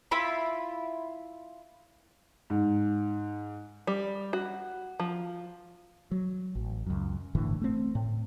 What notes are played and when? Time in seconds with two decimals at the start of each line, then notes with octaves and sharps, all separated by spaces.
0.11 E4 F4 B5
2.50 G#2
3.87 G3
4.33 F#4
5.00 F3
6.11 F#3
6.55 A1
6.86 C#2 F#2
7.35 G1 A2 D3 E3
7.61 A3 C4
7.95 A2